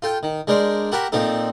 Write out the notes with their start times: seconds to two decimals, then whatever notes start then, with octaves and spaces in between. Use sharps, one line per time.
0.02 F4 A4 G5
0.23 D#3
0.47 G#3 D4 A#4 C5
0.92 F#4 G4 A#4 F#5 A5 B5
1.12 A#2 F3 C4 D#4 A4